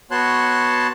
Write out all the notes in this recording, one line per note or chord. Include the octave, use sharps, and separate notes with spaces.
B3 F#4 C#5 A5 C6 F#6